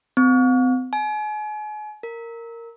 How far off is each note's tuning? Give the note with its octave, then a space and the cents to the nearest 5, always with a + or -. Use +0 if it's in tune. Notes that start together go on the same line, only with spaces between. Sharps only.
C4 -40
G#5 +35
A#4 -10